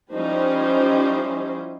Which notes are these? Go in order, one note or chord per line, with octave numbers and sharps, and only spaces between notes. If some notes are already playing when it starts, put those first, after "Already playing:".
F3 G3 C#4 D#4 E4 C5